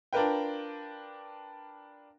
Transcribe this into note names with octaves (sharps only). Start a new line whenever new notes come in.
D4 F4 A#4 B4 G5